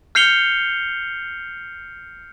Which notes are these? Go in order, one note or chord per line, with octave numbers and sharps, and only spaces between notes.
F6 G6 C7 C#7 F7 G7